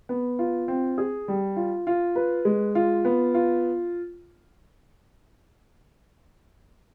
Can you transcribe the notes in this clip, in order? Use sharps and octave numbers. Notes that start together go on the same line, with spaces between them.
B3
F4
C4
G#4
G3
F4
F4
B4
G#3
F4
B3
F4